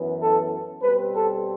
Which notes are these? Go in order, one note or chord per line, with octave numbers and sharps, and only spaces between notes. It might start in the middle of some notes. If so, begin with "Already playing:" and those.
Already playing: F#2 E3 B3
A4
B2 G3 C4 B4
A4